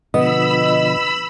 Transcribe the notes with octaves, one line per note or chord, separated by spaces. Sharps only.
B2 D3 F3 B3 D#5 B5 E6